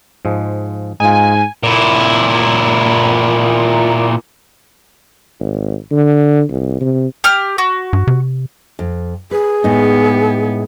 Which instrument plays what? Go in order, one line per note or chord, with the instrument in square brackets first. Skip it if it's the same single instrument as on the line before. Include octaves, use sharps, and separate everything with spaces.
[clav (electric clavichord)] G#2 F3 G#3
[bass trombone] G#2 [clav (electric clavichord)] D#4 F4 [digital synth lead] G#5
[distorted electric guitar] A#2 E4
[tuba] G#1
D3
C2
C3
[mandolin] G4 F6
F#4
[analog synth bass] G2
C3
[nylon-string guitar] F2
[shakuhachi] G#4 [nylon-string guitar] B4
[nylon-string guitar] A2 G#3 D#4 [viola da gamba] B3